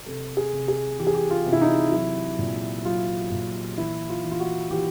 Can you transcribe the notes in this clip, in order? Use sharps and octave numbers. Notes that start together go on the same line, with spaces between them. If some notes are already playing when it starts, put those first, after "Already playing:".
C3 A4
G#4
C3
G#4
E3 G4
G#4
G4
F4
C3
E4
D#4
F#3 E4
A#2
F#3 F4
A#2
E3 E4
F4
E3
F4
F#4
E3 G4